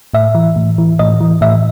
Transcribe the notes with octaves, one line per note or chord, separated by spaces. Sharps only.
A2 E5
E3
A2
E3
A2 D#5
E3
A2 E5